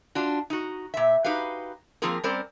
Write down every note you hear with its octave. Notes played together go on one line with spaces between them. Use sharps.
D4 F4 F#4
D#4 F#4
A#2 E5
D#4 F#4 G4 B4 F5
F3 A#3 C4 F4 G#4 A#4
G3 C4 C#4 A#4 C5 D5